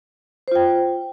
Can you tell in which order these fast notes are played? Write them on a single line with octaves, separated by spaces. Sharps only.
C5 F4 G5